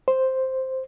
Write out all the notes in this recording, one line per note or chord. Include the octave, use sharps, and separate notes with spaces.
C5